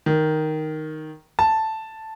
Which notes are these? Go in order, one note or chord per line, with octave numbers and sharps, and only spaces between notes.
D#3
A5